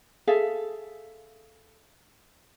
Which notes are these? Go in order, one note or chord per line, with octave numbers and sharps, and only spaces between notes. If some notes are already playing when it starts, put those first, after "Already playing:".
G#4 A4 E5 F5